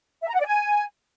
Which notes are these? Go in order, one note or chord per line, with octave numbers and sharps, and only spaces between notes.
E5
A#5
F#5
D5
G#5